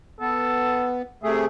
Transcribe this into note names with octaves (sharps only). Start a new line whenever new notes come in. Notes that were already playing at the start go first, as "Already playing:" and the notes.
B3 A4
C3 A3 G#4 E5